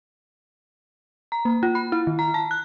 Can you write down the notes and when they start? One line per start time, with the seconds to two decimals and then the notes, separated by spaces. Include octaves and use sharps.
1.32 A#5
1.45 A#3
1.63 F4
1.75 B5
1.92 E4
2.07 D#3
2.19 A#5
2.34 A5
2.51 F#6